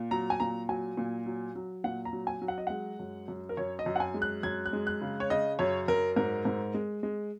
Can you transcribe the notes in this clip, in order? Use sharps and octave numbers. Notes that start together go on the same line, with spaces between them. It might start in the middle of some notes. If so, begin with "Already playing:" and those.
Already playing: A#2
F#3 A#5
G#5
A#2 A#5
F#3 G#5
A#2
F#3
F#3
A#2 F#5
A#5
F#3
G#5
F#3
F#5
D#5
G#3 F#5
F#2
F#2
A#4
F#2 C#5
D#5
F#2
F#5
G#5
G#3
F#6
F#2 G#6
F#6
G#3
F#6
C#3
C#5
C#3 D#5
F#2 C#5
F#2 A#4
G#2 A#4
G#2
G#3
G#3